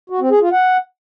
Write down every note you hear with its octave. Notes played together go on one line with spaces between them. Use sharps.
F#4
C4
G#4
F4
F#5